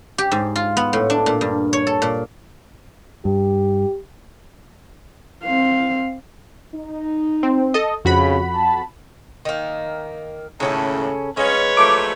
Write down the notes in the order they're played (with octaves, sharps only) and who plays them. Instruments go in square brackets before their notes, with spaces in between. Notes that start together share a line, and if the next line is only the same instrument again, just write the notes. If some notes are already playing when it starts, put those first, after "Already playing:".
[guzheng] G4
G#2
F4
B3
A2
D4
A#2
G2
C#5
A4
A#2
[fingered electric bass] G2 [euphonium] G4
[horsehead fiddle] C4 F5
[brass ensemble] D#4
[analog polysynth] C4
A4 D#5
[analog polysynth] F2 F#4 B5 [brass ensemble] C#3
[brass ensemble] A5
[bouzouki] D#3 A#3
[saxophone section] D#2 A2 [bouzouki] C#3 C#4 A4
[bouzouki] G#3 F5 [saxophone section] C#4 [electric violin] B4 C#5
[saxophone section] F3 F#3 A3 [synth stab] D6